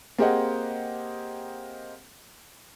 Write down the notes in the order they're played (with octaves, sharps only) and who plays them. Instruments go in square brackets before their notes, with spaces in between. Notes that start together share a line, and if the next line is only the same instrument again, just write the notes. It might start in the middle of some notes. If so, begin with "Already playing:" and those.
[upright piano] A#3 C4 G4 G#4 D#5 F#5